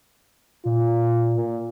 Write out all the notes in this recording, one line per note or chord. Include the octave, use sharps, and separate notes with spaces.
A#2 F4
A#2